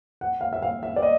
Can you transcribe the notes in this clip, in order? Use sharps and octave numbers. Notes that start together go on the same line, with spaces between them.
F#5
F5
E5
F5
E5
D5
D#5